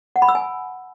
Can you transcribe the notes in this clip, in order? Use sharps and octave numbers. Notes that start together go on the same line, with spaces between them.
F#5
B5
E6
G#5